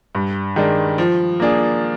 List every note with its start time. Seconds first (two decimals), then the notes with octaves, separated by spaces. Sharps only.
0.15 G2
0.56 D#3 G#3 D4
0.98 F3
1.40 A#3 D4 G#4